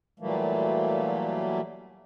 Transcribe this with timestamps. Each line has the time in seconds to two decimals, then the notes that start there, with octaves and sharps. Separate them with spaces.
0.20 A#2 E3 F#3 G3 A3 A#3